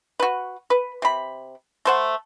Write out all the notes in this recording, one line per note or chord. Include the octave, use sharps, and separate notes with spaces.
F#4 B4
B4
C3 B5
A3 C5 F#5